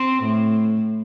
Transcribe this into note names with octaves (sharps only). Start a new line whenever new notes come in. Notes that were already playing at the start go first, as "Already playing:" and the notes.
Already playing: C4
A2